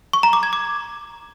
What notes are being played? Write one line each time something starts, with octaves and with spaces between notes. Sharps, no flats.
C#6
A#5
D6
G#6
D6